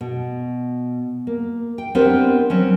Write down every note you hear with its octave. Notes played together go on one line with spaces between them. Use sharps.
B2
A#3
G5
B3 C4 D4 G4 A#4 C5
F#3 C4 C#4